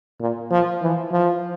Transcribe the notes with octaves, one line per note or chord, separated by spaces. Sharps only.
A#2
F3
E3
F3